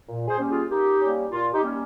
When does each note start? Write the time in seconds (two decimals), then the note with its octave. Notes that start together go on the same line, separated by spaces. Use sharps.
0.07 A#2
0.28 G#4 C5
0.38 G3 A#3 C#4
0.49 F4 G#4
0.70 A#2 D#4 G4
1.01 G3 A#3 C#4
1.32 A#2 F4
1.53 D#4 G4
1.63 G3 A#3 C#4